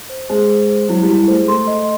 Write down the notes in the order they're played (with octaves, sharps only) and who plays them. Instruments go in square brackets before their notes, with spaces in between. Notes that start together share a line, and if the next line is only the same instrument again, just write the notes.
[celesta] C5
[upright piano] G#3 [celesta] C5
[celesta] C5
C5
[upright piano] F#3 [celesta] E4
[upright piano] G3
[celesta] E4
[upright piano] A3 [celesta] C5
[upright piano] G#3
[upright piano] A3 [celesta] C6
[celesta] D#5